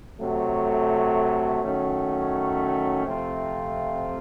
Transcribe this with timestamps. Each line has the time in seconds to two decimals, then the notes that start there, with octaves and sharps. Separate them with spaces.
0.18 C3 F#3 A3
1.62 D#3 F#3 A3 C#4
3.05 C3 F3 A3 C4 F4